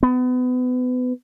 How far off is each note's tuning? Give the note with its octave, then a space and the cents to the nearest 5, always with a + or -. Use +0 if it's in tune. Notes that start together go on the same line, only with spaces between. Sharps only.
B3 +30